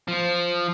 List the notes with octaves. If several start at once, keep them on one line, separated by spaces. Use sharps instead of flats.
F3